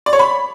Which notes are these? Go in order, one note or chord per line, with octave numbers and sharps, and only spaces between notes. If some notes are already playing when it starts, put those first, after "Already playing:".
D5
C#5
B5